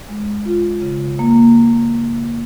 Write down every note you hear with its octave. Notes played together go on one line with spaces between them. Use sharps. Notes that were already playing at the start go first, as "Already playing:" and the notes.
G#3
F4
C#3
A#3